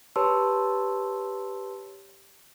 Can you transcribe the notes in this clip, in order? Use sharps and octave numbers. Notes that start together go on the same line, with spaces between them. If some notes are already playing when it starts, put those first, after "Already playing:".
G4 B4 C#5 A5 C6 E6